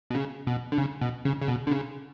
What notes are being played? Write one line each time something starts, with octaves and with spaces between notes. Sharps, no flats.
B2
C#3
B2
D3
C#3
B2
C#3
C#3
B2
D3
C#3